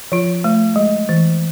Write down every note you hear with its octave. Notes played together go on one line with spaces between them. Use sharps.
F3 F4
A3
G#3
E3